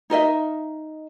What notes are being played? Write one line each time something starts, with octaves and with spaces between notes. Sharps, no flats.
D#4 A#4 D#5 E5